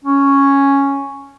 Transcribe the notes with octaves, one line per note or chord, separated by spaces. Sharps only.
C#4